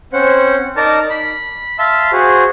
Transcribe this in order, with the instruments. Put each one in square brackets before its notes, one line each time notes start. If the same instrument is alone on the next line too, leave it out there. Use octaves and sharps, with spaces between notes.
[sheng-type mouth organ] C4 C#4 C5 F#5
D#4 A#4 D5 A5 A#5
B5
E5 F5 A5 C6 E6
F#4 G#4 C5